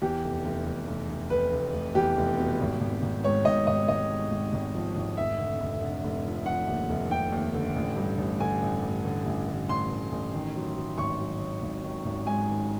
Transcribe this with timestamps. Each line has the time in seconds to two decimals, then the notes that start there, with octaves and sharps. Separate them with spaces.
0.02 E2 G4
0.24 F1
0.45 F1
0.66 F1
0.87 F1
1.09 F1
1.30 F1 B4
1.52 F1
1.73 F1
1.95 E2 G4
2.17 F1
2.38 B2
2.60 G#1
2.80 G#1
3.02 G#1
3.23 G#2 C#5
3.45 G#1 D#5
3.67 G#1 D#5
3.88 G#1 D#5
4.10 G#2
4.31 G#1
4.53 G#1
4.74 F3
4.96 G#1
5.17 F1 E5
5.39 D3
5.60 F1
5.82 D3
6.04 F1
6.25 F3
6.46 F3 F#5
6.67 D#2
6.89 F1
7.11 F1 G5
7.32 D#2
7.54 D3
7.76 A1
7.96 G2
8.18 A1
8.40 D3 G#5
8.62 A1
8.82 G2
9.04 D3
9.26 A1
9.48 D3
9.69 A1 C6
9.90 D3
10.12 A1
10.33 D#3
10.55 F#3
10.77 F#3
10.98 G#1 C#6
11.20 F#3
11.41 D#3
11.62 G#1
11.83 D#3
12.05 G#1
12.27 G#2 G#5
12.48 D#3